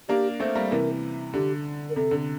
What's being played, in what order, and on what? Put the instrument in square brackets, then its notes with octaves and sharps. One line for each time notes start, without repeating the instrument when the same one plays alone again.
[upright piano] A#3 D4 [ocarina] G4
[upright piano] A3 C4
G3 A#3
[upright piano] C3 E3 [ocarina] A#4
[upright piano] D3 [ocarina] G4
[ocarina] A#4
[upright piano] C3 [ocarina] A4
[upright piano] D3